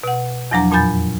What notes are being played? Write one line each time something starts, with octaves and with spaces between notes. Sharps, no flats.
B2 F#5
E2 F3 F#3 D4 A#5
F2 A#2 G#5 B5 G6 A6